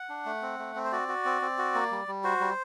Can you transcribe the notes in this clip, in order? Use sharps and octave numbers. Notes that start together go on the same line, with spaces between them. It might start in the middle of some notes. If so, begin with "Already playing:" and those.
Already playing: F#5
D4
A3
C4
A3
C4
C5
F#4 D5
F#4
C4
C4
F#4
A#3
G3
G3
F#4 C5
G3